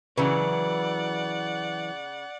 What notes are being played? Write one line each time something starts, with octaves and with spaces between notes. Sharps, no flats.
C#3 E3 F#3 B4 D5 F#5